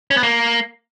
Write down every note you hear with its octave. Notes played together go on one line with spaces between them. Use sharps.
C#4
B3
A#3